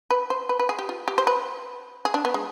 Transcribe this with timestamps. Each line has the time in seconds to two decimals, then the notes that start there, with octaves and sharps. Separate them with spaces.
0.10 B4
0.30 C5
0.49 B4
0.59 B4
0.69 G#4
0.79 G4
0.89 F4
1.08 G4
1.18 C5
1.27 B4
2.05 G#4
2.14 D4
2.25 B3
2.34 G#3